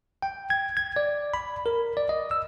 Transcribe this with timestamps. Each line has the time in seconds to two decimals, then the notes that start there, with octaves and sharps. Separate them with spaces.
0.22 G5
0.50 G#6
0.77 G#6
0.96 D5
1.34 B5
1.66 A#4
1.97 D5
2.09 D#5
2.31 E6